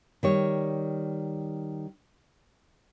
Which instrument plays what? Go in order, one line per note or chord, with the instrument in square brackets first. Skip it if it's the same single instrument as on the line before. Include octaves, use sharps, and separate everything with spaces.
[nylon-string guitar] D#3 G3 C#5